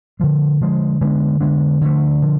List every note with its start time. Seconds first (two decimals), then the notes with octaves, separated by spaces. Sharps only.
0.20 D3 F3 G#3
0.61 D3 F3 G#3
1.01 D3 G#3 B3 D4
1.41 D3 G#3 B3 D4
1.81 D3 F3 A3
2.22 D3 F3